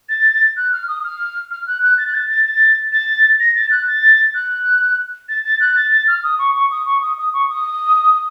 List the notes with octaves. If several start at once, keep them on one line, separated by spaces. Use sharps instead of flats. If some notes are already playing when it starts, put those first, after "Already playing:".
A6
F#6
F6
D#6
F6
F6
F#6
F#6
A6
F#6
A6
A6
A6
A6
A#6
A6
F#6
A6
F#6
A6
A6
F#6
A6
A6
F6
D#6
C#6
C#6
D#6
C#6
D#6
D#6
C#6
D#6